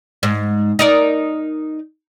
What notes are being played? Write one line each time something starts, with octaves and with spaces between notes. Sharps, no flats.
G#2
D#4 A#4 D5